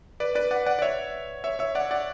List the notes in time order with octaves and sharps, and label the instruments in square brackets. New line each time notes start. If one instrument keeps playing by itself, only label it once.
[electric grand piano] B4 D5
B4 D5
D5 F#5
D5 F#5
D5
C#5 E5
C#5 E5
C#5 E5
D5 F#5
D5 F#5